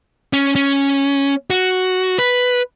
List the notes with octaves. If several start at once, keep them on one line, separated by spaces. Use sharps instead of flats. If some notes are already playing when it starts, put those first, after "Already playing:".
C#4
C#4
F#4
B4